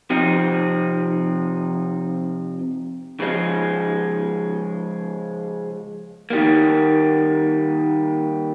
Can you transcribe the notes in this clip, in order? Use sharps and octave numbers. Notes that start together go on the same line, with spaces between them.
C3 F3 C4 D#4
C#3 F3 G#3
D#3 G3 A#3